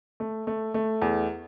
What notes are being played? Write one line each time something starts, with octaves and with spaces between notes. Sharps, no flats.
A3
A3
A3
E2